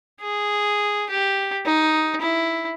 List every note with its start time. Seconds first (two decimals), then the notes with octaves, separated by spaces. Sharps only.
0.22 G#4
1.10 G4
1.66 D#4
2.21 E4